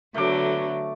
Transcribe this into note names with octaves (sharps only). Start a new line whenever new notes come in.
D3 F#3 A3 B3 D6